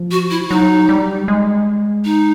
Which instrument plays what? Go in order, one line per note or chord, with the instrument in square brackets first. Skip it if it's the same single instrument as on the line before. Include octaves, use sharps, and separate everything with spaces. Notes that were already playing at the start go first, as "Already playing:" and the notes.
Already playing: [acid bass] F3
[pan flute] F#4
E4
[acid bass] F#3 [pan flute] D#4
[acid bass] G3
G#3
[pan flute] D#4